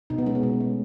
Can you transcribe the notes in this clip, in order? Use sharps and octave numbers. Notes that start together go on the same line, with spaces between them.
B2 D#4
B3
G#3 C#4
B3
B2 C#4
A3